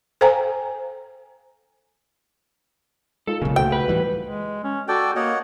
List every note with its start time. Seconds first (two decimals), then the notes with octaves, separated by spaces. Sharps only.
0.21 A4 C5 F5 G5 G#5 A#5
3.27 G#3 D#4 F4 A4
3.42 B1 A#2 C#3
3.56 C#2 A#2 A3 F#4 C5 F5 G5
3.72 B4
3.88 A2 E3 G3
4.24 G#3
4.64 C#4
4.88 F#4 A4 D5 G5
5.16 A#3 C#5 D#5 F#5